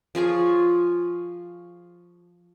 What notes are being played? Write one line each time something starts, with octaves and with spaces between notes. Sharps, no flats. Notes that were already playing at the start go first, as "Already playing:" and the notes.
F3 F4 G#4 C#5